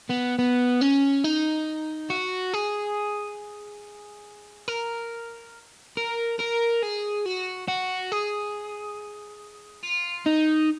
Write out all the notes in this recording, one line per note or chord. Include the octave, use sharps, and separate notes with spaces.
B3
B3
C#4
D#4
F#4
G#4
A#4
A#4
A#4
G#4
F#4
F#4
G#4
F4
D#4